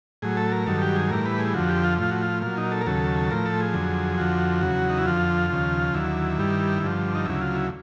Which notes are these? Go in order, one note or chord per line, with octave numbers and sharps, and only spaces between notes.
A2 F#3 G#4
A4
A#4
G2 D#3 F#3 A4
G4
G#4
A2 E3 G3 A#4
B4
G#4
F2 D3 F3 F#4
G4
F4
A2 F3 F4
F#4
F4
A#2 F#3 F4
D#4
A4
A#4
D#2 C#3 F#3 A4
A2 F3 A#4
A4
G#4
F2 D3 F#3
F2 D3 F3 F#4
E2 C#3 F#3
D#4
E4
F2 D3 F3 F4
D#2 C#3 F3
D#2 D3 F#3 E4
G2 D#3 G3
G2 D3 F3
D#4
D2 C#3 F#3 E4
F4
E4